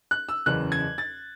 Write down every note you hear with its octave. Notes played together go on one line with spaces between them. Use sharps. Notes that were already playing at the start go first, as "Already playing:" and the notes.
F#6
E6
F#1 E2 C#3 F#6
G#6
A6